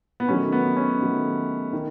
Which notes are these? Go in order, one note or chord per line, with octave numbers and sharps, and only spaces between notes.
B3
D#3 F#3 A3 C#4
B3
C#4
D#3 F#3 A3
D#3